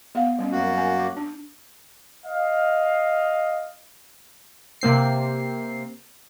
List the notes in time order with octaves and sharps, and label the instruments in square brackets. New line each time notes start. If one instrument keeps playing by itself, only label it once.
[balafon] B3 F5 F#5
G3 C4 C#4
[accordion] F#2 A#3 F#4
[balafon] G#5
D6
D4
[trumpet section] D#5 F5
[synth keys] C3 A#3 C4 C7